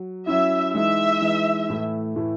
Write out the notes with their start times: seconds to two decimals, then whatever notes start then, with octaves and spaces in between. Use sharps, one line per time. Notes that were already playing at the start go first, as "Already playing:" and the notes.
Already playing: F#3
0.27 F#3 C#4 E4 E5
0.74 E3 G#3 D#4 E5
1.22 E3 G#3 D#4
1.69 A2 E3 A3 E4
2.16 A2 E3 A3 E4